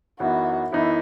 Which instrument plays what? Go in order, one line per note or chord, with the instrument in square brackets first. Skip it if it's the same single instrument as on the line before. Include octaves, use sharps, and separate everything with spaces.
[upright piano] F#2 E3 B3 D#4 [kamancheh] F#4
[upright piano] F#2 E3 B3 D#4 [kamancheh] E4